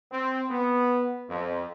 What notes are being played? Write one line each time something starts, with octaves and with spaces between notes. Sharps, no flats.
C4
B3
F2